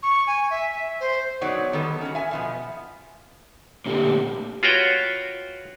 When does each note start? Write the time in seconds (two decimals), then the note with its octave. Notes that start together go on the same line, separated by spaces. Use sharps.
0.03 C#6
0.27 G#5
0.50 E5
1.00 C5
1.41 F#3 B3 D#4 G#4 C#5 D5
1.73 D#3 G3 B3 A4
2.01 C#4 F#4
2.15 E5 G#5
2.31 B2 F3 B3
3.86 A#2 D3 A3 G4
4.63 F4 F#4 B4 C#5 G5